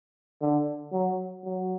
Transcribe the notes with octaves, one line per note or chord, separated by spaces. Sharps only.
D3
F#3
F#3